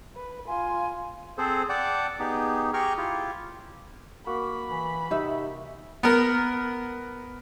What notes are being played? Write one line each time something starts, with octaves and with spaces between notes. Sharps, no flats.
B4
F4 G#5 C6
C4 G#4 A4 C5
D5 F#5 G5 A5 D6
B3 D#4 G4 G#4
G4 G#4 G5 A#5 C#6 F6
E4 F4 G4
A#3 F#4 B5
E3
C3 D#4 E5
B3 A#4